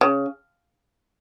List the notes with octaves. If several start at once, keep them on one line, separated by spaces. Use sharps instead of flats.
C#3